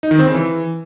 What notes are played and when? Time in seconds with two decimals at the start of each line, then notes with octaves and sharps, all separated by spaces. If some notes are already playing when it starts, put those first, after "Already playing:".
0.03 D#4
0.11 D#3
0.19 C4
0.27 C#3
0.34 E3